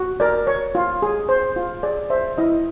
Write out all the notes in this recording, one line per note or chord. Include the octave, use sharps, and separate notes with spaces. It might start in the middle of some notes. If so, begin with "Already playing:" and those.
Already playing: F#4
A#4 D5
C#5
F4
G#4
C5
F4
G#4 D5
C5 E5
E4 D#5